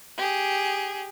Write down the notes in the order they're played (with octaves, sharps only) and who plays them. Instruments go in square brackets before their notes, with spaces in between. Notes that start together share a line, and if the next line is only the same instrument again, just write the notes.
[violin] G4 G#4